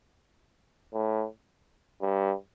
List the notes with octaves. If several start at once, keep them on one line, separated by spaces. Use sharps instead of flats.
A2
G2